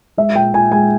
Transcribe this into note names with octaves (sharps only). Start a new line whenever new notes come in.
G#3 E5
A#2 G5
A#2 G#5
G#3 G#5